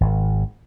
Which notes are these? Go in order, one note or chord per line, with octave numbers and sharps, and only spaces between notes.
G#1